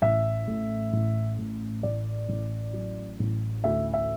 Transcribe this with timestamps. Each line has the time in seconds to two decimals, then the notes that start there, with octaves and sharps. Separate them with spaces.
0.02 A1 E5
0.48 A2
0.93 A1
1.38 A2
1.83 A1 D5
2.29 A1
2.73 F#3
3.19 A1
3.64 D2 E5
3.94 E5